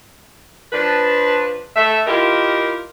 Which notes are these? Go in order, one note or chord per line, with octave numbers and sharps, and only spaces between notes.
F3 D4 B4
A3 E5
E4 F4 G4 A#4 D#5